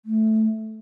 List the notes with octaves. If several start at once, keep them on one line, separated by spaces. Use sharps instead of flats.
A3